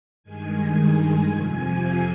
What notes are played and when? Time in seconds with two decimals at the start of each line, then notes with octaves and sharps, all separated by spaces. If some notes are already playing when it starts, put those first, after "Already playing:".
0.23 G2 D#3 G#3 G#5
0.75 G#5
1.27 F2 C3 F3